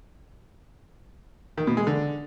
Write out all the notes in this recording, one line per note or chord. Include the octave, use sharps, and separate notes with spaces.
D#3
B2
G#3
D3